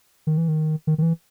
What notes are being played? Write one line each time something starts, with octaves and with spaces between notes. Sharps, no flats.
D#3
E3
D#3
D#3
D#3
E3